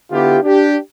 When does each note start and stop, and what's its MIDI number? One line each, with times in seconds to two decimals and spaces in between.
0.11 0.38 50
0.11 0.38 59
0.11 0.38 64
0.11 0.38 65
0.11 0.38 67
0.43 0.76 62
0.43 0.76 67